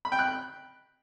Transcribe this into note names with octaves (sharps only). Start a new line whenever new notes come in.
B5
G5
F#6